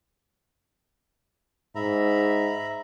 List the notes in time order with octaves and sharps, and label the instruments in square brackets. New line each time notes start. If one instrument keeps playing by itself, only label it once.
[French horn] G#2 [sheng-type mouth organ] E5 A#5 B5